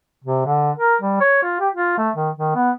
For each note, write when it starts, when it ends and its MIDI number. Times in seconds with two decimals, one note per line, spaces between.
0.24 0.45 48
0.46 0.71 50
0.78 0.95 70
1.01 1.18 55
1.21 1.42 73
1.43 1.60 65
1.60 1.69 67
1.74 1.93 65
1.98 2.10 57
2.16 2.30 51
2.38 2.54 51
2.55 2.71 59